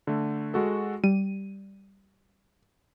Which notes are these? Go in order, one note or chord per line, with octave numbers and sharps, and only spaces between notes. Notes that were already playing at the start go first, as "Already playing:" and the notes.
D3 A3
G#3 F#4 A4
G3 D#7